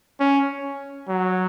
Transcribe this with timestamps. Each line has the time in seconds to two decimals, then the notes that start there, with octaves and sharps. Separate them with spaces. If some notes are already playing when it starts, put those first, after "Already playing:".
0.19 C#4
1.08 F#3